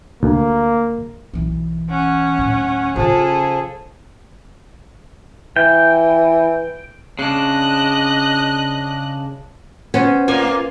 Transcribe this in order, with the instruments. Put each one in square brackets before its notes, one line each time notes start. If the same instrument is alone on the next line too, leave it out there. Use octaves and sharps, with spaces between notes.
[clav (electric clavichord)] D2 [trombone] A#3
[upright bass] B1 E3
[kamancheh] C#4 F#5
[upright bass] D1 D#2
[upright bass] C#3 C#4 [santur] F3 [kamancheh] G#4 A4
[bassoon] E3 [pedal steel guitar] G5
[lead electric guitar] C#3 D4 [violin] D#5 F#6
[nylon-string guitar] B3 [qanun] C#4 C5
[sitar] A2 A#3 F4 [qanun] G#5